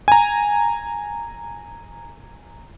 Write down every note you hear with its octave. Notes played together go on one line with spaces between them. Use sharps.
G#5 A#5